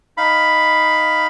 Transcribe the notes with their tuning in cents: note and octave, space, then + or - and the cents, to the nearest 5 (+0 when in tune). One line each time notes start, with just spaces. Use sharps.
D#4 +0 F5 +0 B5 +5